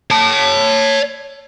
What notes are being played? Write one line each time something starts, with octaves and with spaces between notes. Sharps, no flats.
C#5 A5